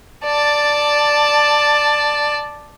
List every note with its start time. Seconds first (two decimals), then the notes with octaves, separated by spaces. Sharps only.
0.25 D5 A5